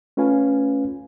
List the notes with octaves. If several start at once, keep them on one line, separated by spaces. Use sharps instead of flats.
A3 C#4 F4 B4 F5 G#5